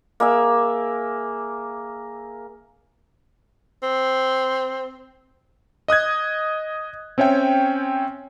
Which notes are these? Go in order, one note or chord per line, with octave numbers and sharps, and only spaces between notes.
A#3 G#4 E5
C4
D#5 D#6 F#6 G#6
C4 C#4 C#5 E5 G5